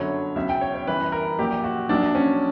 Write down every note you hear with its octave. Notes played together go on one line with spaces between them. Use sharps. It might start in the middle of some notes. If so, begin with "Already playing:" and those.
Already playing: G1 F#2 D3 F#3 C#5
C#2 B2 F#3 E5
G5
C#5
C#5
G1 F#2 E3 G3 B4
A#4
A#1 A#2 F#3 G4
F#4
A#1 A#2 F#3 D4
C#4